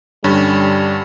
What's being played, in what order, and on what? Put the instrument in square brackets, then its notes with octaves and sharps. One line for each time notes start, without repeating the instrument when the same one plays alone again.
[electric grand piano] G2 D3 C#4 [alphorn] G3